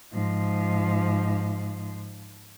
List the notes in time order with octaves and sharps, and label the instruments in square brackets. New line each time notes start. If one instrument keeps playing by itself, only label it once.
[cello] G#2 F3